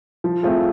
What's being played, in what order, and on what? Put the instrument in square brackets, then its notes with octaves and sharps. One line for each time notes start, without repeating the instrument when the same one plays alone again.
[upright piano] F3
A3 C4 F4 G#4